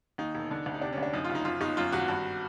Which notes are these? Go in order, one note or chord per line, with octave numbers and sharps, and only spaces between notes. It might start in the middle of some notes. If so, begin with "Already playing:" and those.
D#2 D#4
E1
D3
D2
D#4
C3 D4
C#4
D2 D4
F#2 D#4
F4
F#1
D#4
F#2 F4
G1 D#4
F#2 F4
G#1 F#4
G2